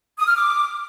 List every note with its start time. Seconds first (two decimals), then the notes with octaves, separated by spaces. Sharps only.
0.17 D#6
0.26 F6
0.36 D6